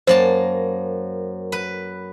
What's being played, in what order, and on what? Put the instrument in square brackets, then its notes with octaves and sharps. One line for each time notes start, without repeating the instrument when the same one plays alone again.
[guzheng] F#2 A#3 A5 [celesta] C5
[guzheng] B4